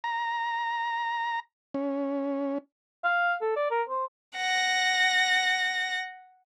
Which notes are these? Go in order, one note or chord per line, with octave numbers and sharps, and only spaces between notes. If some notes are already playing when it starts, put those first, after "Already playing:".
A#5
C#4
F5
A4
D5
A#4
C5
F#5 A#6